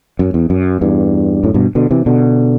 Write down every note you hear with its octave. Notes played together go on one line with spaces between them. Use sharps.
F#2
E2
F#2
E2 G2
F#2 A2
G2 B2
B2 D3
C3 E3
B2 D3